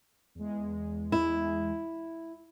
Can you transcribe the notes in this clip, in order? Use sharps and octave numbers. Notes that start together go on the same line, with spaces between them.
E2 G#3
E4